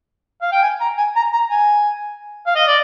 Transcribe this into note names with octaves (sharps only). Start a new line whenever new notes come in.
F5
G5
G#5
A#5
G#5
A#5
A#5
G#5
F5
D#5
D5